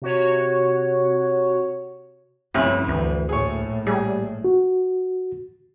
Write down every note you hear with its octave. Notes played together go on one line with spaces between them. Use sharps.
C3 F#4 C#5
G1 F2 A2 C3 C#4 E4
D2 E3
A#1 A2 G#4 C#5
G3 G#4
F#4